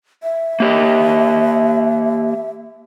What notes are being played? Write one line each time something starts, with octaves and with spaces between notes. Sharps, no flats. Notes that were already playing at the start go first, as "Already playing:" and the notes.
E5
A#3 G4 D#5